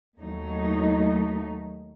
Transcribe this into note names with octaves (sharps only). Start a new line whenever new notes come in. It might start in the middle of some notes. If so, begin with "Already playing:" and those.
D#2 F#3 A3 D#4